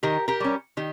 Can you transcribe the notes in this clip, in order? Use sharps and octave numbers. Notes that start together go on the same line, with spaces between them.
D#3 G4 A#4
G4 A#4
G3 C#4
D#3 G4